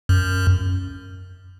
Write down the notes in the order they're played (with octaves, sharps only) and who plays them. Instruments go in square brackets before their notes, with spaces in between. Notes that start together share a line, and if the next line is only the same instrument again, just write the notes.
[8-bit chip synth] F#2